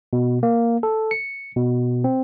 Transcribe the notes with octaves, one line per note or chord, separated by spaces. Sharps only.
B2
A#3
A4
C#7
B2
C4